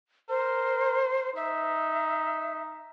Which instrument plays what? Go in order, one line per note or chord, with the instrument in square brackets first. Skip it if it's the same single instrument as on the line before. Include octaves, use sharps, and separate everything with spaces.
[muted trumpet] A#4 [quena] C5
[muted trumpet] D#4 [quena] E5